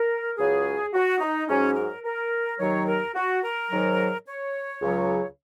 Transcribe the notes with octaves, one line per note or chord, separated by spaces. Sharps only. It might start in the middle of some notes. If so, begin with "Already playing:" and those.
Already playing: A#4
C#2 C#3 F#3 G#4
F#4
D#4
G#2 F#3 C#4
A#4
A#4
D#2 D#3 F#3 C#5
A#4
F#4
A#4
G#2 D#3 F#3
C#5
C#2 C#3 F#3